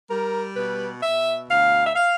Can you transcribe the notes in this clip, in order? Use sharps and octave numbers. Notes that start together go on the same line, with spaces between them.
G3 A#4
B2 B4
B2 E5
D2 F5
E5
F5